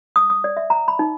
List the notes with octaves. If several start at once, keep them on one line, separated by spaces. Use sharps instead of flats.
D#6
D#6
D5
E5
A#5
B5
D#4